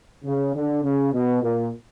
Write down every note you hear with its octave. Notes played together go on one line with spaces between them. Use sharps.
C#3
D3
C#3
B2
A#2